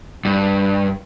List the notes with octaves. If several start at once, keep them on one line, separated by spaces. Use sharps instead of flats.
G2